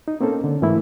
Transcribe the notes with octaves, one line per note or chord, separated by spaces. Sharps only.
D#4
A#3 C4 C#4 A4
D3
G#2 E3 A3 A#3 E4